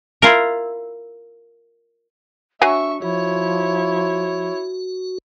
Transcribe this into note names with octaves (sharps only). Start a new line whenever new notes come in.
E4 F4 A#4
F#3 D4 E5 G#5 C#6
F3 E4 F#4 C#5